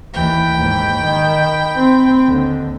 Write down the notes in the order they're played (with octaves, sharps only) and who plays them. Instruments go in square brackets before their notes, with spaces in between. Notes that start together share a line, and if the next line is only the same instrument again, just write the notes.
[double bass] D#2 E3 [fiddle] G5 B5
[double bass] D#2 G#2
D#3
C4
D#2 D3